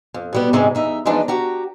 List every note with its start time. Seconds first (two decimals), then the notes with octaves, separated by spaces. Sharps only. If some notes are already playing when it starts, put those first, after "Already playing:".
0.14 F2
0.33 B2 G3 B3
0.53 G#2 C3 D#3 G3 G#3
0.75 E2 D#4 E5
1.05 E3 F3 G#3 B3 D4 D#4
1.28 F#4 G4 A#5